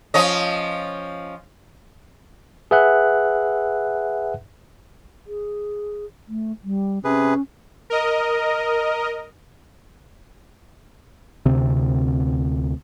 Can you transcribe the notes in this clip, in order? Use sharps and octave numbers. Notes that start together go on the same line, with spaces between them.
F3 C#4 D#5
G#4 B4 E5 F#5 F#6
G#4
A3
G3
C3 C#4 G#4 B4
A#4 D#5
D2 C3 C4